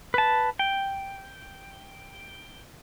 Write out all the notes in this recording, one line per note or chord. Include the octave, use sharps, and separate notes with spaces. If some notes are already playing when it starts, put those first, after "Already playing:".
B4 A5
G5